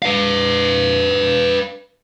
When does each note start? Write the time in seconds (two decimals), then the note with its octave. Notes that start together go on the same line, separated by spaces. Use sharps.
0.02 B4 F5